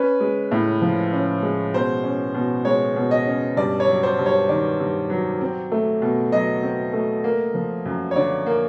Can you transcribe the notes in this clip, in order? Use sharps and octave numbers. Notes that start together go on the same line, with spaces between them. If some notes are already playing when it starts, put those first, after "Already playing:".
Already playing: C#4 B4
G#3
A2
F3
C#4
G#3
B2 C5
C#4
B2
G#3 C#5
B2
D#5
C#4
G2 D5
C#5
F#3
C5
G2
C#5
D#3 D5
G2
F#3
C4
A3
B2
F#3 D#5
C4
A3
A#3
F3
F#2
C#5
D3 D5
A#3